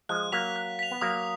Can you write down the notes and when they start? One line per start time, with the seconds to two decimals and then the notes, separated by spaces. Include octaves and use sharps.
0.09 F3 G#3 F#6
0.32 F#3 A#3 B6 F7
0.56 F#6
0.79 B6 F7
0.91 B3
1.01 F#3 A#3 D#6